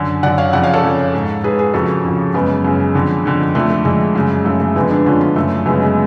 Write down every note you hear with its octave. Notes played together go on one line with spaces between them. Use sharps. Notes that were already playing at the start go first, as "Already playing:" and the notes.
Already playing: F#2 D3
F#2 D3 D5 F#5
C#5 F5
F2 C#3 D5 F#5
C#5 F5
A4 C#5
F2 C#3
G#2
G#2 G#4 B4
G#4 B4
F2 C#3 F#4 A4
F2 C#3
F#2 C#3 G#3 B3
F#2 C#3
F2 D3
F2 D3
F2 D3 A3
A3
F2 D3 G#3
F#2 C#3
F#2 C#3 A3
A3
F2 D3 G#3 B3
B3 D4
F2 D3 C#4 F4
C#4 F4
F#2 C#3 A3
F#2 C#3 G#3 B3
G#3